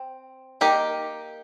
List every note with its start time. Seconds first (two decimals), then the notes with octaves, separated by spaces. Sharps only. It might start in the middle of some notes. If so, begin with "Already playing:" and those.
Already playing: C4
0.61 A#3 D#4 G4 A#4